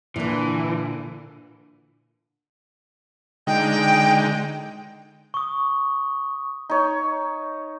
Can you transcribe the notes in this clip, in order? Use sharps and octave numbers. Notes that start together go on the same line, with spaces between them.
A#2 D3 E3
D3 G#3 D#4 G5
C#6 D#6
D#4 C#5